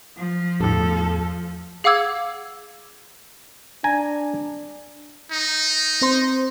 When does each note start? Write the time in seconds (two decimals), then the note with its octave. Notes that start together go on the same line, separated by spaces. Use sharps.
0.17 F3
0.60 G1 E2 A2 A4
1.84 G#4 F5 F#5 D6 E6 G#6
3.84 D4 G#5 A#5
5.31 D#4
6.02 C4 C5 C6